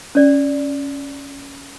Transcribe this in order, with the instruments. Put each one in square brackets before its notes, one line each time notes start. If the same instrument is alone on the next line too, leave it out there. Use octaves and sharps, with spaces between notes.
[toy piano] C#4 D5